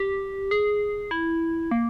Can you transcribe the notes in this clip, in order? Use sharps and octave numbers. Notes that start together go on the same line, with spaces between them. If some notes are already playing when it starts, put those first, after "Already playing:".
Already playing: G4
G#4
E4
A#3